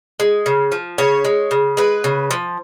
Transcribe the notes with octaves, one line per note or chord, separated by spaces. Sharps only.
G#3
C#3
F3
C#3 C#5
G#3
C#3
G#3 B4
C#3
F3